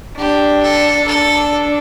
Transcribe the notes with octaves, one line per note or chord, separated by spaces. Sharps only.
D4 G4
A4
D4 A4